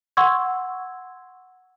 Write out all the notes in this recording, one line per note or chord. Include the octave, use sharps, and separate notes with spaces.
F#5 C6 C#6 E6 G#6